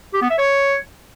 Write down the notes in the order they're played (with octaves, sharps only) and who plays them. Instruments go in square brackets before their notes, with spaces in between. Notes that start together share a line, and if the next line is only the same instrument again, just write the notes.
[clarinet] G4
B3
E5
C#5